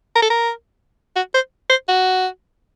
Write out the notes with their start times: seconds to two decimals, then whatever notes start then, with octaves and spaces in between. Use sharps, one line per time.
0.15 A#4
0.22 A4
0.30 A#4
1.16 F#4
1.34 C5
1.70 C5
1.89 F#4